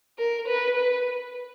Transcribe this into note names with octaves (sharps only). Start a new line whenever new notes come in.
A#4
B4
B4